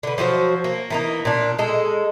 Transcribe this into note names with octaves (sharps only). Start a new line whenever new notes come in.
D3 B4
F3 F#3 F#4 C5
A#3
E3 A#3 D#4
A#2 D4
G#3 A4